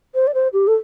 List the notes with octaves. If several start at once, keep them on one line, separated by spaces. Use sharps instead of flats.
C5
D5
C5
G4
A4